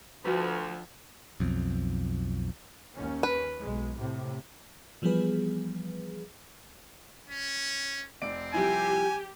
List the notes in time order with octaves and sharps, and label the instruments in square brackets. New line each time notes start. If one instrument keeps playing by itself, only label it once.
[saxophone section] D2 [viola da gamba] F3 [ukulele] F#4 B4
[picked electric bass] B1 F2
[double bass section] D#2 C#4
[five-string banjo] B4
[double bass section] B1 G#3
A2 C3
[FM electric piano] E3 F3 G3 B3 G#4 B4
[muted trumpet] C#4
[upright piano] F1 D5 D7 [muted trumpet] C4
[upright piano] C2 F3 E4 [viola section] G4 [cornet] G#5